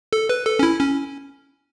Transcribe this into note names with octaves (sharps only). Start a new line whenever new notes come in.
A4
B4
A4
C#4
E4
C#4